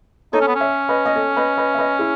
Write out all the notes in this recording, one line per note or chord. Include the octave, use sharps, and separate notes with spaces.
D#4 A4 C#5
C#4
B3
C#4
C#5 E5
B4 D#5
D#5
A4 C#5
B4 D#5
B4 D#5
E5
B4 D#5
E4 G#4